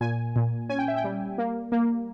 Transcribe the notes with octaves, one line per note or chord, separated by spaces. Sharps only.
A#2 G#5
A#2
C#4 G#5
G5
E5
G5
G3
A#3
A#3